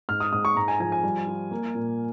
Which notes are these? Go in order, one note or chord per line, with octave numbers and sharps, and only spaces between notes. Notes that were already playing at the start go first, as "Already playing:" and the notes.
G#2 F6
D#6
G#2 D#6
C#6
G#2 A#5
G#5
F3 G#5
G#5
G3
F4
A#3
A#2